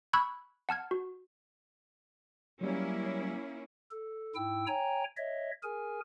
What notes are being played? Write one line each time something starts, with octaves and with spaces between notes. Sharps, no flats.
B5 C#6 E6 F#6 G#6
F#5 A5 F6 G#6
F#4
F#3 G3 A#3 C#4 E4
A4
G#2 E4 G5 E6
C#5 G5 G#5 A#5
C#5 D#5 E5
G#4 A#4 G#5